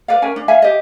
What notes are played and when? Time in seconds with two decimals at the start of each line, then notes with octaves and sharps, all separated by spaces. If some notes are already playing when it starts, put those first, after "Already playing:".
0.08 B4 D5 F5
0.22 C#4 A#4 G#5
0.36 D4
0.48 E5 F5 G#5
0.62 G4 D#5